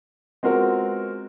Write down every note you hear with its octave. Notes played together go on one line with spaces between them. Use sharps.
G#3 B3 C4 F4 F#4 A#4